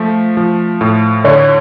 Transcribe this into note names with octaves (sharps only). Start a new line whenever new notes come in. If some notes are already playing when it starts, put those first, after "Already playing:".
Already playing: F3 A3
F3
A2
D3 C#5